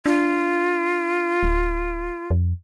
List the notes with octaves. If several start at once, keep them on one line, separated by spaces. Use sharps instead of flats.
D4 F4
D1
F2